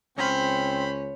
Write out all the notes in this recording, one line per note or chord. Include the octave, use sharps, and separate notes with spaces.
C#2 C4 C#4 C5 B5